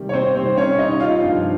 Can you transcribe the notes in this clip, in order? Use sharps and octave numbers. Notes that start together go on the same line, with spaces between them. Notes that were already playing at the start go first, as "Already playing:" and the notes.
Already playing: C3 D#3 G3
C#5
C4 C5
C3 D#3 G3 C4 C5
C#4 C#5
D#4 D#5
F4 F5
G2 F3 C4 D#4